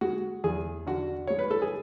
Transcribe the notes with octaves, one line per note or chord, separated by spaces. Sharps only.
G#3 F#4
E2 G#4
D3 F#4
G#3 C#5
B4
A4
G#4